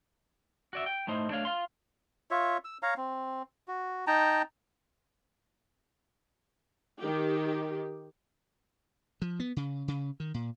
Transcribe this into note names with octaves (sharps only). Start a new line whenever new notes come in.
F#4 D5 E5
G5
A2 A3 D#4 C5
A3 D4 C#5 F5
F4 F5 C6
F4 C#5 E5
E6
C#5 F5 A#5
C4
F#4
D#4 G5 A5 A#5
D#3 G4
F3
B3
C#3
C#3
D#3
A#2